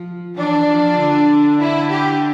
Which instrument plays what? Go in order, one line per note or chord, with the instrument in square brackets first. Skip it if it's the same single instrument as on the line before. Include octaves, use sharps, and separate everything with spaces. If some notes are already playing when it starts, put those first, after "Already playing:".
Already playing: [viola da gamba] F3
[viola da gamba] E3 [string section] D4
[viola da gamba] F3
D3
[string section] E4
G4